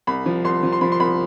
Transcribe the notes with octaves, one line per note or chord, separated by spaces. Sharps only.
C2 B5
F3
C2 C6
F3
C6
F3 B5
C6
C2 B5